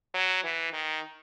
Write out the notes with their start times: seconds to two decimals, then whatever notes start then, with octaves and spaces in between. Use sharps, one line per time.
0.14 F#3
0.44 E3
0.73 D#3